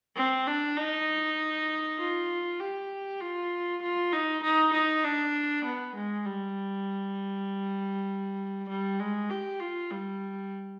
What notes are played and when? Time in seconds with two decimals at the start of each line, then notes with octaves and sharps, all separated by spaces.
0.16 C4
0.47 D4
0.77 D#4
1.99 F4
2.60 G4
3.21 F4
3.82 F4
4.12 D#4
4.43 D#4
4.73 D#4
5.04 D4
5.64 B3
5.95 G#3
6.25 G3
8.69 G3
9.00 G#3
9.30 G4
9.60 F4
9.91 G3